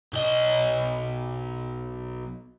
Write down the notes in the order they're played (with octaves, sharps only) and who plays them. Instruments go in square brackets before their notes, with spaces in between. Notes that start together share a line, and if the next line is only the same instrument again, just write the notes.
[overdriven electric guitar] B1 D#5